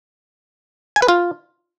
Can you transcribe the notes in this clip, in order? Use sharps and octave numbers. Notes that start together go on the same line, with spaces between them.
G#5
B4
F4